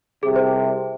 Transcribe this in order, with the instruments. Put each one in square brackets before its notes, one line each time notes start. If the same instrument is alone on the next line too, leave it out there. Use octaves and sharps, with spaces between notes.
[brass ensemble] C2 C3 [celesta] G#4
[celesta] C5